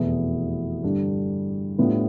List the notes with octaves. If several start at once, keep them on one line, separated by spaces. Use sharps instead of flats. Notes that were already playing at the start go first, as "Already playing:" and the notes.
Already playing: F1 E2 B2 B3 E4
G2 D3 G3 D4
A2 G3 B3 D4 F4